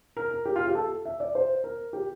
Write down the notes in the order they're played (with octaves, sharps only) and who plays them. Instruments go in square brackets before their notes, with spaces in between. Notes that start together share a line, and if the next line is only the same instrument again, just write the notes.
[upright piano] A#4
A#4
G4
F4
G4
A4
E5
D5
C5
A#4
G4